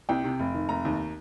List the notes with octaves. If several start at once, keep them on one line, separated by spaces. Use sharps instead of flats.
C2 G5
C3
F1
D#3
F1 A#5
D#2